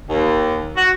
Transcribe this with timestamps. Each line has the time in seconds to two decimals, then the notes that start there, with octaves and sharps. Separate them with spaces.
0.09 D#2
0.76 F#4